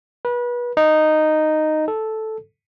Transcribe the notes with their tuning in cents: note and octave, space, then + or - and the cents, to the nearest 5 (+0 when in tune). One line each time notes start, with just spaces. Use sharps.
B4 -30
D#4 -10
A4 -5